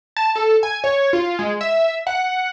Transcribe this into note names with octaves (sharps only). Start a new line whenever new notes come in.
A5
A4
G#5
C#5
F4
G#3
E5
F#5